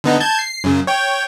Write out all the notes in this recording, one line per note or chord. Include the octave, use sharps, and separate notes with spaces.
D3 B3 D#4
A5 G6 G#6
C7
F#2 C#3
C#5 G5